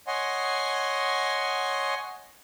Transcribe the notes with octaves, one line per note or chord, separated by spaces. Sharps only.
C#5 D#5 F#5 G#5 C6